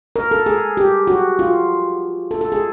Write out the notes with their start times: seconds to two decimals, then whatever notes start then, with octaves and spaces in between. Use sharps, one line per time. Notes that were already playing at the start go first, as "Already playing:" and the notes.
0.16 A#4
0.31 A4
0.46 G#4
0.77 G4
1.07 F#4
1.39 F4
2.31 A4
2.41 A4
2.52 G#4